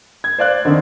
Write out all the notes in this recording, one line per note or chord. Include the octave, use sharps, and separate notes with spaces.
G#6
C5 D5 F5 F#6
D3 D#3 C4